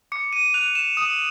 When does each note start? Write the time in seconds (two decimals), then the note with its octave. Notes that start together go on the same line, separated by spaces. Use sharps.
0.12 D6 C#7
0.33 D#7
0.54 F#6 F7
0.75 E7
0.97 D#6 E7